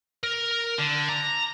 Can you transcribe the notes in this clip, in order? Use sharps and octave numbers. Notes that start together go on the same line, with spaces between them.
A#4
D3
A#5